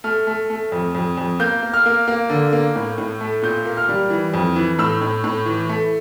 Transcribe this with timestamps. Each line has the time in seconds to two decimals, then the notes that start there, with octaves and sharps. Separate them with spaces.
0.04 A3 F6
0.27 A3
0.50 A3
0.72 F2
0.95 F2
1.17 F2
1.40 A#3 G6
1.63 A#3
1.73 F6
1.86 A#3
2.08 A#3
2.30 D3
2.53 A#3
2.76 A2
2.98 A2
3.21 A3
3.42 A#2 G6
3.65 A#3
3.77 F6
3.89 G3
4.10 E3
4.34 F2
4.56 E3
4.79 A2 E6
5.01 A2
5.24 A2
5.46 E3
5.69 A3